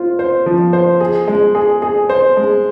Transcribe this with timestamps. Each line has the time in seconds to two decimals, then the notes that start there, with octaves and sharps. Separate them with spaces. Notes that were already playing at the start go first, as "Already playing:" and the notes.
Already playing: F4 C5
0.19 C5
0.46 F3
0.73 C5
1.00 G#4
1.28 G#3
1.55 G#4
1.82 G#4
2.09 C5
2.37 G#3